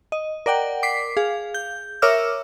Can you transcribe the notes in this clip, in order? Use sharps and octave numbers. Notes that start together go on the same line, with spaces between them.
D#5
A#4 D5 F#5 G5
D6 B6 C7
G#4 F5
G6
A#4 C#5 E5 D6 E6 F6